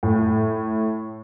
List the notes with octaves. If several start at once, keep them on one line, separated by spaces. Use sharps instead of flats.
A2